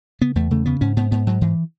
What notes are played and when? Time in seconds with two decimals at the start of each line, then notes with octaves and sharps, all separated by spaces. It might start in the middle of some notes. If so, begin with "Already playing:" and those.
0.21 C#3 B3
0.35 E2 A3
0.51 C#3 A3
0.66 C#3 B3
0.81 G#2 C#4
0.96 G#2 B3
1.11 G#2 B3
1.27 G#2 F#3
1.41 G#2 E3